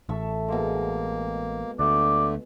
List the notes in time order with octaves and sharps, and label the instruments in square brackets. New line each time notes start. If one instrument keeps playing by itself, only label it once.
[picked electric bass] A1 [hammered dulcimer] A4 E5 C#6
[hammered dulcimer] B2 G#3 [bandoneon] A#3
[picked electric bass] D2 [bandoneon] D3 A3 [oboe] D5